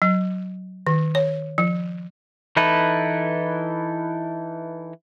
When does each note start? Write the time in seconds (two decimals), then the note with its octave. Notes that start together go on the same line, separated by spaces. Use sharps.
0.02 F#3
0.87 D#3
1.15 C#5
1.58 F3
2.57 E3 D#4 E4 A4 B4